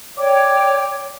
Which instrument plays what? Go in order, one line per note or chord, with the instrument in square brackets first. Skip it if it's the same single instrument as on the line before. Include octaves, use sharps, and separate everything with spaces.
[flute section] C#5 G5 [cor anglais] D5